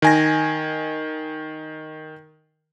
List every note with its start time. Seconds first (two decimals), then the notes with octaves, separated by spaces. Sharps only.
0.02 D#3 G#5 A#6